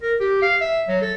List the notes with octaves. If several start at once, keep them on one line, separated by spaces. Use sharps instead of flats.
A#4
G4
F5
E5
F#3
A4